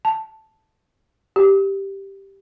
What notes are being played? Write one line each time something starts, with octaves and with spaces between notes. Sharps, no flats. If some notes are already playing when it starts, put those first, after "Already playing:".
A5
G4